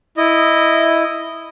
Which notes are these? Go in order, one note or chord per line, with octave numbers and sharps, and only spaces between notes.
E4 D#5